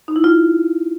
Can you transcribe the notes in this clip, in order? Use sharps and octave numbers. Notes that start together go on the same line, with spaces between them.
D#4
E4
F4